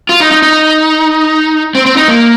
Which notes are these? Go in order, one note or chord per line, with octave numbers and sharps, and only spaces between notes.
F4
D#4
D#4
D#4
C4
C4
D#4
A#3